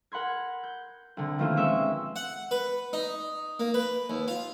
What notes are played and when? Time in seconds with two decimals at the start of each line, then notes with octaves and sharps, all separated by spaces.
0.12 A#4 F#5 B5 C6 G#6
0.64 G6
1.17 C2 D3
1.39 B2 D#3 F3 A3 A#3 F4
1.57 G#3 C4 C#4 E5 C6 C#6
2.16 F#5
2.51 B4
2.93 D#4
3.60 A#3
3.74 B4
4.10 D#2
4.28 F4